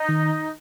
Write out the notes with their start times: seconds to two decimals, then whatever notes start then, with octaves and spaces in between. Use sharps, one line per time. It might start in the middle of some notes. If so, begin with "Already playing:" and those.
Already playing: D#4
0.09 D#3